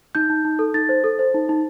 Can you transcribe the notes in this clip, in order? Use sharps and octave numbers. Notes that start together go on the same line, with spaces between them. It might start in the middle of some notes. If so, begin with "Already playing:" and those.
D#4 G6
D#4
D#4
A4
D#4 A6
C5
A4
C5
D#4
D#4